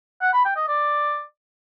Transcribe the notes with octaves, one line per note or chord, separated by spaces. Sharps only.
F#5
B5
G5
D#5
D5